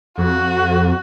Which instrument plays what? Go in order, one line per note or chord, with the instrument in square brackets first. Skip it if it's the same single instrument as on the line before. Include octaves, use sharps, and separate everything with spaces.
[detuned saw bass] F2 [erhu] F#4